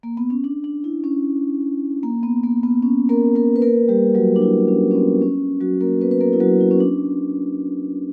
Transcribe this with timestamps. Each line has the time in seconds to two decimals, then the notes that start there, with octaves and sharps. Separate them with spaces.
0.03 A#3
0.17 B3
0.30 C#4
0.44 D4
0.64 D4
0.84 E4
1.04 C#4
2.03 A#3
2.23 B3
2.43 A#3
2.63 B3
2.82 C#4
3.09 A#3 A#4
3.35 A#3 A#4
3.56 B4
3.62 A#3 A#4
3.88 G3 G4
4.15 F#3 F#4
4.36 D4
4.42 E4
4.68 C#4
4.91 C#4
4.95 B3
5.22 C#4
5.61 F#3 F#4
5.81 A#3 A#4
6.01 B3 B4
6.11 B4
6.21 A#3 A#4
6.33 E4
6.40 F#3 F#4
6.60 E4
6.71 C#4
6.80 D4